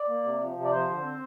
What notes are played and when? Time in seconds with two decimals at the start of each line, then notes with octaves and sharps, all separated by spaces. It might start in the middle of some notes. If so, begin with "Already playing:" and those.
Already playing: D5
0.08 A#3
0.24 C3
0.41 F3
0.56 C3
0.65 D5
0.72 F3 C5
0.88 D3
1.03 C4